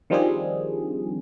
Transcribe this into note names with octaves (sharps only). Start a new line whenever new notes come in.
D#3 F3 G3 C4 D4 G#4